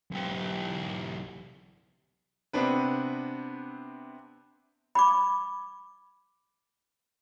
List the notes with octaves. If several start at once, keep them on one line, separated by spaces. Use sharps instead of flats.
B1 G4
C3 B3 C4 D4 B4
B5 D6